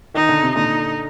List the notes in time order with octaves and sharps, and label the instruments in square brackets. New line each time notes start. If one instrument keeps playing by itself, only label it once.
[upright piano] D#3 [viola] D#4
[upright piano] D3
C3
[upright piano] A#2 D3 [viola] D#4